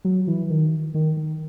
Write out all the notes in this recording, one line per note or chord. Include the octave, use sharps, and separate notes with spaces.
F#3
E3
D#3
D#3
D#3